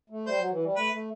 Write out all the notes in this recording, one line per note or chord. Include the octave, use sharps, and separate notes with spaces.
A3
G3 C5
F#3
E3
G3
A3 B4
A3